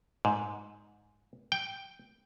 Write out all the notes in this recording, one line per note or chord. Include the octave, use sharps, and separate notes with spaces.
G#2
G5